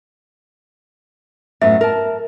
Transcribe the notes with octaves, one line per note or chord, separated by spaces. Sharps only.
F#2 A2 B3 E5
A#4 A5